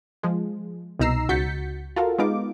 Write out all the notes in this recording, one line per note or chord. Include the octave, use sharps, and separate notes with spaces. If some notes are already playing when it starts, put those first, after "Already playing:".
F3 G#3
C2 B2 D#4 A#5 E6 C7
C#2 F#4 G6 A6 B6 C#7
F4 F#4 A4 A#4 F5
G#3 B3 D#4 F4 D6